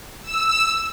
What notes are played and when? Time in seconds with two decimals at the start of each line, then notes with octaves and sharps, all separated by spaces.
0.23 E6